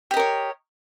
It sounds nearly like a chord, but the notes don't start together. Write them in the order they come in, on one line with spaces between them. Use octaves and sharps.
G4 D#5 A#4 C#5